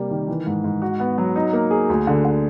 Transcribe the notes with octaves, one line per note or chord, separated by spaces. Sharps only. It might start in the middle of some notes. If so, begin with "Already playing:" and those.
Already playing: C3 G3 A#3
D#3
E3
G#2
G#2
F#4
B3
F#3
D#4
A#3
G#4
D2
D3
D3